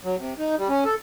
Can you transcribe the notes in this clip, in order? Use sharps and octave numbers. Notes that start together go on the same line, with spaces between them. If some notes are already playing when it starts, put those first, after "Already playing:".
F#3
C3
D#4
G3
C#4
A4